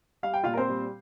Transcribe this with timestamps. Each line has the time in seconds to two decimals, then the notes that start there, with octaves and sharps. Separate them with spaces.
0.23 G3 F5
0.34 G5
0.44 A#2 F4 F5
0.54 A#4
0.57 C4 C5
0.69 G3